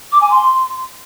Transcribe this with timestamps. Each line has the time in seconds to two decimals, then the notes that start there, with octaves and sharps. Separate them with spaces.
0.12 D6
0.21 G#5
0.30 C6